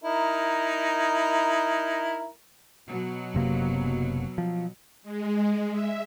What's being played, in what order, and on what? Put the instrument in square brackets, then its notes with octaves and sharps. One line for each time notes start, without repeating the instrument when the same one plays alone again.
[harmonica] D#4 E4 A#4
[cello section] B2 F#3
[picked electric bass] F#1 C3 A#3
F3
[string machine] G#3
E5